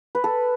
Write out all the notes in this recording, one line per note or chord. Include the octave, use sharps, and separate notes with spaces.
B4
A4